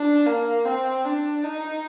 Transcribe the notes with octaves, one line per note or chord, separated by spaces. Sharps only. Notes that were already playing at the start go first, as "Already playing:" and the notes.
Already playing: D4
A#3
C4
D4
D#4